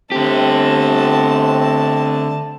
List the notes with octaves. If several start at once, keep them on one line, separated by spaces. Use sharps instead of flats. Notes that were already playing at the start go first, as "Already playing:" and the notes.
D3 A3 C4 G4 A5